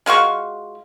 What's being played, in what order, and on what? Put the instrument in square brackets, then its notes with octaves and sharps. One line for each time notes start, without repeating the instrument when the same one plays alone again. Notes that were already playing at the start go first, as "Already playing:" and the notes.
[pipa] G#3 F4 F#4 C#6